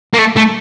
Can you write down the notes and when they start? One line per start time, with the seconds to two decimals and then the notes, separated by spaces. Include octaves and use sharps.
0.13 A#3
0.18 A3
0.36 A3